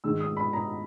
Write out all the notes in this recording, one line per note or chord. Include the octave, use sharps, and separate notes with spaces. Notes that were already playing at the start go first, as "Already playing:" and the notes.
G#2 D#3 G#3 E6
D#6
B5
A#5